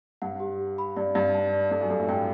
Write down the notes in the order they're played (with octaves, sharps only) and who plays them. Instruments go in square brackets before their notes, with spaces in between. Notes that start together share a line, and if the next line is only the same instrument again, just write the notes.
[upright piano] G2 [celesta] F#5
[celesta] G4
G4
B5
[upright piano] G2 [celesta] D5
[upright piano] G2 [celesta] D5
[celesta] A5
D5
[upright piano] G2 [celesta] A4
[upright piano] F#2
[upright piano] G2 [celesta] A4
[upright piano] A2
[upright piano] G2 [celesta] G5